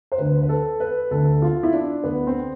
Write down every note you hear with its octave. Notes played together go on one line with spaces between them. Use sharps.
C5
D2 D3 B4
B4
A4
B4
D2 D3 A4
F4
E4
D4
D2 D3 B3
C4